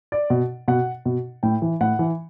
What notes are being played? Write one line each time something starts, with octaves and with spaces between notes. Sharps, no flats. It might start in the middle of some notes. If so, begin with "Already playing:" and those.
D5
B2
B2 F#5
B2
A2 G5
E3
A2 F#5
E3